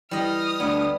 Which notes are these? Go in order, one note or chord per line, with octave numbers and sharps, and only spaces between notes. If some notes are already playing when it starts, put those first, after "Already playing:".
E3 G3 D#5 D#6 F6
D2 B3 D5 B5